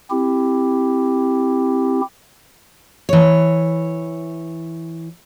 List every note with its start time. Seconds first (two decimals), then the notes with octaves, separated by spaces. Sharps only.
0.10 C4 E4 G4
3.09 E3 C#5